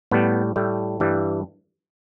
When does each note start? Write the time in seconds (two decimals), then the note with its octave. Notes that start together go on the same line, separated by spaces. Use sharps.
0.11 A2 G3 B3
0.56 A2 G3 A3
1.00 G2 E3 G3